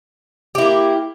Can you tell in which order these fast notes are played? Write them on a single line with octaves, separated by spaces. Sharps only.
G4 E4 A#3